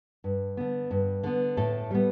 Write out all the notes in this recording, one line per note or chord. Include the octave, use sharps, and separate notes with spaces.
G2
D3 B3
G2
D3 B3
A2 A4
G3 B3